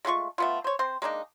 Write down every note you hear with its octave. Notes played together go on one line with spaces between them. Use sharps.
G#3 A3 F4 C#6
A3 B3 F4
C5 C#5
C4 C5
G#3 A#3 D4 D#4